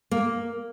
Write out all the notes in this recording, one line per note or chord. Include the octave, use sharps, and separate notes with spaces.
A#3